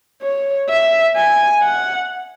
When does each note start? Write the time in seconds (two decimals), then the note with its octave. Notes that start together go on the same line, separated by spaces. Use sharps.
0.22 C#5
0.69 E5
1.16 G#5
1.63 F#5